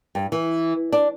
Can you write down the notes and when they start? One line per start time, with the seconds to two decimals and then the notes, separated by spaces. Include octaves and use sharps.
0.15 G2
0.32 E3
0.93 D4